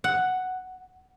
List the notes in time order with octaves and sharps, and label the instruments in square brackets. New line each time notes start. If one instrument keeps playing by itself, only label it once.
[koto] F#5